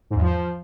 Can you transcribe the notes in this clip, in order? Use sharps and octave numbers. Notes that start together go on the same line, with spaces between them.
G#2
E2
F3